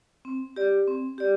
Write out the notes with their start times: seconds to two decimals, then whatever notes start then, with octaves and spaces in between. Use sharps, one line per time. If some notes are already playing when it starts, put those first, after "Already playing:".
0.25 C4
0.56 G4 D5
0.87 C4
1.18 G4 D5